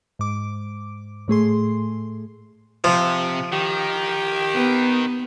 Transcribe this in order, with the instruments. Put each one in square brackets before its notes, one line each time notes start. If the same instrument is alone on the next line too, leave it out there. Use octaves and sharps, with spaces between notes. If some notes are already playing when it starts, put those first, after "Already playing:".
[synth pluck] G#2 D6
A2 A3 G#4 C6
[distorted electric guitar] C3 [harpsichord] F3
[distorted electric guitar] D#3 [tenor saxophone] G4
[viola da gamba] B3